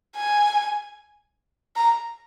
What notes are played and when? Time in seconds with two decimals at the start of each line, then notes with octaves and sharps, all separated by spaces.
0.15 G#5
1.76 A#5